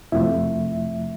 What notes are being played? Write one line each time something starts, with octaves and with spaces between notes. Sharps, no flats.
F2 C3 F3 A3 E4 E5